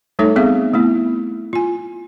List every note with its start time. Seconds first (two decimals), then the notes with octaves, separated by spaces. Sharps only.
0.19 G3 A3 D#4 A4 C#5 E5
0.36 G3 B3 C4 G#4 E5 F5
0.74 A3 B3 E4
1.53 F4 G#5